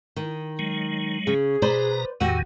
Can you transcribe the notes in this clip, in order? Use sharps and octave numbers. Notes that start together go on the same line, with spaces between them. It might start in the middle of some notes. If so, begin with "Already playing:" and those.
D#3
F#3 G#3
C#3 G#4
B2 B4 C5 D5 A#5
E2 A2 D#3 F#4 G4 F#5